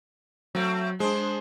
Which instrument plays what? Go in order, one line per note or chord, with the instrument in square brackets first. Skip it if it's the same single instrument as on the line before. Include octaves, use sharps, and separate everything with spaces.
[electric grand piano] F#3 [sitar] A3 C4
[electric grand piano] G#3 [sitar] D4 G#4 [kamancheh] C5